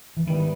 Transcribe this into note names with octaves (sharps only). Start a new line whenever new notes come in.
E3
G#2 D#3 G3 B3 E4